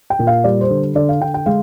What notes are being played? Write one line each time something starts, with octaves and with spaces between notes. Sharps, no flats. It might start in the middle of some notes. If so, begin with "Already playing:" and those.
G5
A#2
F5
G3 D5
C5
D3
D3 D5
F5
D3 G5
G5
G#3 F5